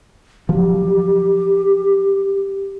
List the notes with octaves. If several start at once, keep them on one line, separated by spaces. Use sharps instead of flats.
F3 F#3 G4